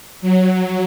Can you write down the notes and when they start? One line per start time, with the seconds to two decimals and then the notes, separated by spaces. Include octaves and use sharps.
0.21 F#3